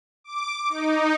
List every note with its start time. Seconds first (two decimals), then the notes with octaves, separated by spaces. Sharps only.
0.24 D6
0.70 D#4